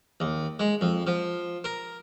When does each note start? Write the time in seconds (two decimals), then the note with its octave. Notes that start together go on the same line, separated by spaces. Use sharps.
0.20 D#2
0.60 G#3
0.81 F2
1.07 F3
1.64 A#4